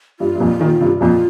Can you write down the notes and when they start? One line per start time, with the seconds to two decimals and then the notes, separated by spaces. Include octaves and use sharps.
0.20 G2 F4
0.35 G2
0.40 F2 A#2
0.60 A#2 D#3
0.80 G2 C3
1.01 F2 A#2 F4